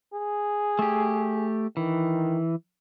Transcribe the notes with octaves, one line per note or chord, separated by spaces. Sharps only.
G#4
A3 G4
D#3 E3